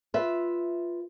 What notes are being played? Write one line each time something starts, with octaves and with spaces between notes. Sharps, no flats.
F4 B4 E5